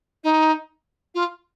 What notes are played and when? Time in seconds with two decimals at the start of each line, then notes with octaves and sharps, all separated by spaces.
0.23 D#4
1.14 F4